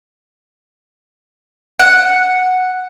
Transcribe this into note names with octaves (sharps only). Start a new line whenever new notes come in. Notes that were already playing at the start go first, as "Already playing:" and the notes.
F#5